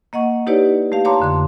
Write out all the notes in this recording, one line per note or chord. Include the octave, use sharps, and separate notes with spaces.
A#3 D#5 F#5 C#6
D#4 E4 G4 B4 C#5 D5
A3 G4 F5
C#5 F5 A5 A#5 C6 D6
F2 D3 C6